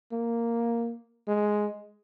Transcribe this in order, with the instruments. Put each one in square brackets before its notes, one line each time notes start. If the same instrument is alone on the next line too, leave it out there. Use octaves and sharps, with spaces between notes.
[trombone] A#3
G#3